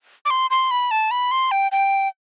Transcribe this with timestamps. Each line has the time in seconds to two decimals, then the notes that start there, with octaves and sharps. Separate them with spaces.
0.25 D6
0.30 C6
0.51 C6
0.71 B5
0.91 A5
1.11 B5
1.31 C6
1.51 G5
1.72 G5